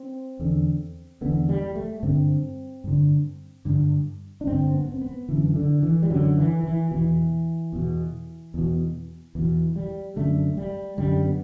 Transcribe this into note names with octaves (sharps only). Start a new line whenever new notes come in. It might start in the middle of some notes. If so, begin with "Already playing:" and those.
Already playing: C4
E2 D3
E2 D3 B3
G3
A3
G2 D3 C4
G2 D3
G2 D3
D4
G2 D3 C4
B3
C4
B3
F#2 D3 E3
D3
E3
G3
F#2 D3 F#3
E3
E3
E2 B2 E3
E2 B2
E2 B2
E2 B2 E3
G3
F#2 D3 A3
G3
F#2 D3 G3
B3